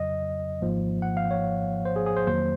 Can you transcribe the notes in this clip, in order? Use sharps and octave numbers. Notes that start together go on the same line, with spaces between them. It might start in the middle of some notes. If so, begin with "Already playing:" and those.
Already playing: F2 C#3 F#3 D#5
G#1 G#2 F3 A#3
F#5
F5
C#5
C5
G#4
G#4
C5
F2 D#3 F#3 A#3 C5